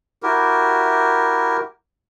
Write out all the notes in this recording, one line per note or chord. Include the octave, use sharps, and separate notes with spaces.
E4 F#4 G4 A#4